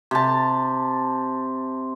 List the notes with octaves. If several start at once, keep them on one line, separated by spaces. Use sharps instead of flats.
C3 A5